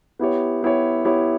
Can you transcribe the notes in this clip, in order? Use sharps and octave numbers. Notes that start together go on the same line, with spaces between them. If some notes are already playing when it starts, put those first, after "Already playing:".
B3 E4 G4 C#5
B3 E4 G4 C#5
B3 E4 G4 C#5